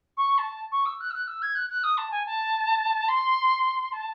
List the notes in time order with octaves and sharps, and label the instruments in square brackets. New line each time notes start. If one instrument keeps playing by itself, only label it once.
[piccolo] C#6
A5
C#6
E6
F#6
E6
F#6
E6
G#6
F#6
F#6
D#6
A5
G#5
A5
C6
A5